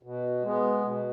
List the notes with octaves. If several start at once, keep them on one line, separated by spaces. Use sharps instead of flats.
B2
G#3 B3
B2